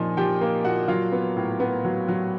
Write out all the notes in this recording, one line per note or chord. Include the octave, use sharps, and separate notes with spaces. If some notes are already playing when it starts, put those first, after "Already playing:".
Already playing: A#2 F3 D#4 G#5
F3 G4 G5
A#3
A#2 F#4 F#5
F#3 F4 F5
B3
A2
B3
F#3
F#3